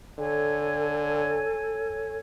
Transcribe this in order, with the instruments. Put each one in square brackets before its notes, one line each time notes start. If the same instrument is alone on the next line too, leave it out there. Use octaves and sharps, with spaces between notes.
[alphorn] D3 [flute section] A4 C#5 G#5